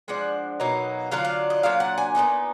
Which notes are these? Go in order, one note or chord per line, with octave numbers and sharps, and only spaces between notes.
F3 G#3 D4 F#5
B2 F#3 A#3 D#4
D3 F#3 D4 F4 F5
F5
D#5
A#2 F#3 D4 F5
F#5
G#5
A#2 F3 B3 D#4